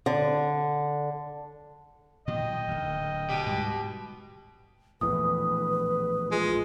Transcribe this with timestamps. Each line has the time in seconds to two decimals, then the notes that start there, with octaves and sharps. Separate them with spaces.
0.06 D3
2.28 A#2 D#3 F#3 D#5 G5
2.68 D1 D2
3.29 B2 G4
3.47 G#2 G3
5.01 A#1 E2 A2 B4 D#6
6.31 G#3 F4